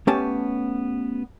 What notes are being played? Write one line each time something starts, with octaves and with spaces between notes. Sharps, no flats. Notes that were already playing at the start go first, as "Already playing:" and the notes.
A3 B3 C#4 G4 A5